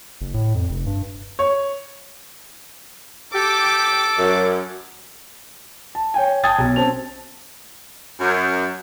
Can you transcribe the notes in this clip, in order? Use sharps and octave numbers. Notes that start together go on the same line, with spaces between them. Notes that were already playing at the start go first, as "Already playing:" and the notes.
F#1
A2
F2
F1
G2
C#5
G4 A4 D6
F#2
A5
C#5 G5 G#5
G5 A5 D#6 G#6 A6
B1
C4 C#4 A5 F7
F#2